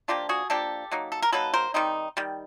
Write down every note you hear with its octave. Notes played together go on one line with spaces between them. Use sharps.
F3 A#3 D4 F4 G4
F#4 G#4
F3 A#3 D4 G4 A4
F#3 A#3 D#4
A4
A#4
F#3 A#3 D#4 A4 B4
A#4 C5
D#3 G3 C4 D#4
D#3 G3